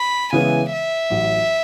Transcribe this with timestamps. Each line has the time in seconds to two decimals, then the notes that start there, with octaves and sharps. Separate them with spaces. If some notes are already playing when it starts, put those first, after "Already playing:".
Already playing: B5
0.33 C#3 E3 G#3 B3 E4 G#5
0.72 E5
1.10 A1 A2 F#3